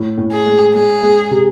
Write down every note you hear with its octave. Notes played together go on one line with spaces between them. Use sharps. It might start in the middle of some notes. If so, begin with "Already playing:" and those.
Already playing: A2
A2
G#4
G#3
G#3 G#4
G#3
C3